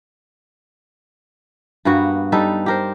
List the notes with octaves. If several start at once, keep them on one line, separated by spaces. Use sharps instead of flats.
G2 A#3 B3 F#4
G3 D#4 A4 B4
G4 A#4 C5